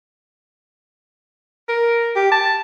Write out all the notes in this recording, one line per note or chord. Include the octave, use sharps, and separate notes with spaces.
A#4
G4
A5